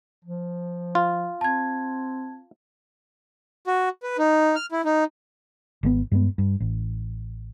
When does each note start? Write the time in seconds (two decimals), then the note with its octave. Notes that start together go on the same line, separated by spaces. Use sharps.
0.25 F3
0.95 F4
1.41 C4 A5 G#6
3.67 F#4
4.03 B4
4.18 D#4
4.56 F6
4.72 E4
4.85 D#4
5.83 G#1 D3 B3
6.12 G2 G#3 B3
6.38 G2
6.60 A1